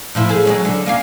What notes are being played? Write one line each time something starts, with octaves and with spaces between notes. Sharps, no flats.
A2 F3 E4
G#4 A4
F#3 G#3 C#4
D3
A#3 C#4 F5